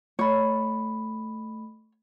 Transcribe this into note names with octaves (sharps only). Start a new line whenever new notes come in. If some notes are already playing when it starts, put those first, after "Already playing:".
A3 C#5 B5